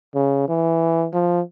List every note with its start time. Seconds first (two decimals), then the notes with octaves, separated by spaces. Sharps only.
0.15 C#3
0.48 E3
1.13 F3